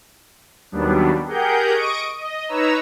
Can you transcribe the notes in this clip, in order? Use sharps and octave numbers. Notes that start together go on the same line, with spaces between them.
D#2 F#3 G3 B3 D4
G4 G#4 A#4 F#5 G6
D#5 C#6 D#6 D7
D#5
D#4 B4 C#5 A#5 E6